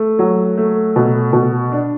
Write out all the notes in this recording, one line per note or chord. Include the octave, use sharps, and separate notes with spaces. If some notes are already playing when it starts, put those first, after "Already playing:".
Already playing: A3
F#3
A3
B2
B2
D4